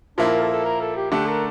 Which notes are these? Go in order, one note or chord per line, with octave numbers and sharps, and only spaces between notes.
A#2 F3 A#3 D4 E4
A#4
A4
A4
A#4
A4
G4
D3 A3 D4 G4
A#4